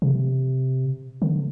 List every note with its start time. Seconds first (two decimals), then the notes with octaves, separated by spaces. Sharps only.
0.02 C3
1.22 D3